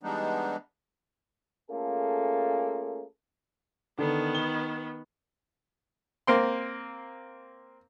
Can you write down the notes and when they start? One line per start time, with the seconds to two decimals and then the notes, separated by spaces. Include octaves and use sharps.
0.03 E3 G3 G#3 B3 D4 D#4
1.70 A3 A#3 C#4 F4 G#4 A4
3.98 D3 D#3 B3
4.35 G7
6.27 A#3 C4 C6